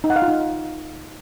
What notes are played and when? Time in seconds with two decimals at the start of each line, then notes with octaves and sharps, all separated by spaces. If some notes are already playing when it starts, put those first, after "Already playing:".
0.04 D#4
0.10 F#5
0.16 F5
0.22 F4
0.28 D#4